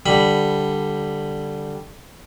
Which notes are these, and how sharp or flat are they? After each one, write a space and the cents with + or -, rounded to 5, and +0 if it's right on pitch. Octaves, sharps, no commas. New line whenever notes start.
D3 +0 G3 +0 B5 +0